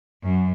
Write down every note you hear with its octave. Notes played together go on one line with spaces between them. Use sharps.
F#2